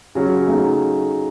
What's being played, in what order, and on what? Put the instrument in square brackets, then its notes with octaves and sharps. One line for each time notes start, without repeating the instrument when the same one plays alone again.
[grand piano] C#3 F#3 C#4
C#3 F#3 A3 D#4